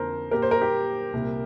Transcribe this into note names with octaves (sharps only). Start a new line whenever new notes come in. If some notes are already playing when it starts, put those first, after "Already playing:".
Already playing: F2 D3 A#3 F4 A#4 C5
A#2 A#3 G4 A#4
C5
A#4
G4
C2 A#2 A#3